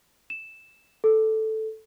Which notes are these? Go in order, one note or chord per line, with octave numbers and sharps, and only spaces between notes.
E7
A4